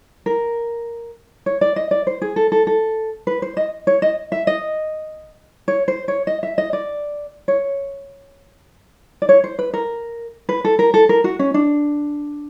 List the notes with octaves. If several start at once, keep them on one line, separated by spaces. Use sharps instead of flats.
A#4
C#5
D5
D#5
D5
C5
G#4
A4
A4
A4
B4
C5
D#5
C#5
D#5
E5
D#5
C#5
C5
C#5
D#5
E5
D#5
D5
C#5
D5
C#5
C5
B4
A#4
B4
A4
A#4
A4
A#4
F#4
C#4
D4